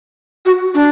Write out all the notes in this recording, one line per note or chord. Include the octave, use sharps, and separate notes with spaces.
F#4
D4